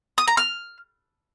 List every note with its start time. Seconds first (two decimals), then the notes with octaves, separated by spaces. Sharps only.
0.18 D#6
0.28 A#5
0.37 F6